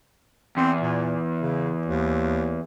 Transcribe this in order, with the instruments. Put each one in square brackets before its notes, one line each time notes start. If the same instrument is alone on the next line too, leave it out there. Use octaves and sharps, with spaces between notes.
[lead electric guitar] E2 [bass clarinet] C4
[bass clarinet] A#2
C#3
D#2